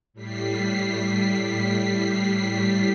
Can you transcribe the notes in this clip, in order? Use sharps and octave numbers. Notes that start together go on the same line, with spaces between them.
A2 G3 B6 C7